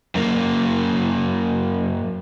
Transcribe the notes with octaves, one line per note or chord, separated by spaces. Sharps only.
F#2 A#3